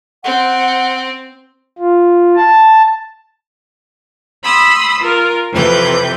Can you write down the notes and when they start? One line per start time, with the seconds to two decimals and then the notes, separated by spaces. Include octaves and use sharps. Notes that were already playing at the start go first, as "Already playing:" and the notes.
0.24 C4 F#5
1.78 F4
2.36 A5
4.43 B5 C6 D#6 E6
5.00 F4 A#4
5.52 F2 C3 E3 B4 G6